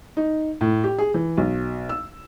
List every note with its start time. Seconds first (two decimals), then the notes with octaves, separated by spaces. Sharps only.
0.17 D#4
0.61 A2
0.84 G4
0.98 G#4
1.14 E3
1.38 B1
1.89 E6